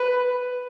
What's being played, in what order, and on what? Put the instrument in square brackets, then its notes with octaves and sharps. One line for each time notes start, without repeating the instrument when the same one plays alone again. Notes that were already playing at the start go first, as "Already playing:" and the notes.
Already playing: [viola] B4